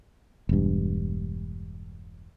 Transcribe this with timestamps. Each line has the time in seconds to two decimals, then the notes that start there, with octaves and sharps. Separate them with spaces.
0.49 E1 G2